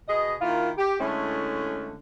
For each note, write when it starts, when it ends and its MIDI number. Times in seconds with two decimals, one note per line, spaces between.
0.09 0.34 47
0.09 0.34 68
0.09 0.34 75
0.41 0.70 51
0.41 0.70 58
0.41 0.70 64
0.41 0.70 65
0.77 0.98 67
0.99 1.99 50
0.99 1.99 56
0.99 1.99 57
0.99 1.99 61
0.99 1.99 64